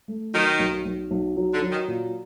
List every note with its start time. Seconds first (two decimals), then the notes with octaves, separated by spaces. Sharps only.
0.08 A3
0.34 D#3 F#3
0.59 B1
0.85 B1
1.11 B1
1.36 F#3
1.54 D3
1.62 F#3
1.71 D#3
1.88 A#2